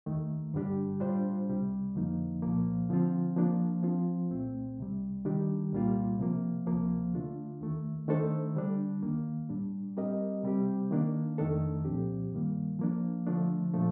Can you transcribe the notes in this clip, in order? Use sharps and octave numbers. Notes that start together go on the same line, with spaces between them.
D#2 D#3 A3
G2 D3 G3 D4 G4
A2 G3 D4 F4 C5
C2 C3 G3
F2 D3 F3 A#3 D#4
C2 A#2 F3 A#3
D3 F3 C4 F4
F3 A#3 D4
F3 C4 F4
C2 A#2 A3 C4
C2 C3 G3
D#3 G3 D4 G4
C2 A#2 G3 A#3 F4
C3 F3 A#3
D2 C3 F3 A#3
D3 A3 D4 F4
D#2 D#3 A3
D#3 A3 D4 A4 C5
D3 G3 D4
D#2 D#3 A#3
A2 G3 D4
G3 C4 G4 A#4 D#5
C3 G3 C4 G4
D#3 A#3 D4
F2 D#3 A3 D4 A4
C2 A#2 F3 C4 G4
G2 D#3 G3 A#3
F3 A#3 D4
D3 F3 A3 D4
A#2 F3 A3